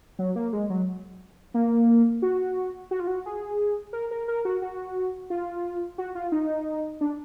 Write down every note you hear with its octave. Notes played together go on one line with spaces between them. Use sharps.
F#3
A#3
G#3
F#3
A#3
F#4
F#4
F4
F#4
G#4
A#4
A#4
A#4
F#4
F#4
F4
F#4
F4
D#4
D4